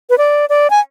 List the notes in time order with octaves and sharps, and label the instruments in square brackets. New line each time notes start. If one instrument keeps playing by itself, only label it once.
[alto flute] B4
D5
D5
G#5